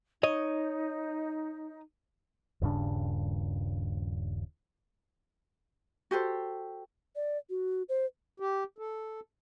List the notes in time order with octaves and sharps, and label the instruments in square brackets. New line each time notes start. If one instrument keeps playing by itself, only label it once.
[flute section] D#4 [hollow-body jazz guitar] C#5 D#5
[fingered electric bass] D#1 G2 C#3 D4
[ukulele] F#4 G4 A4 C5
[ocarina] D5
F#4
C5
[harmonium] G4
A4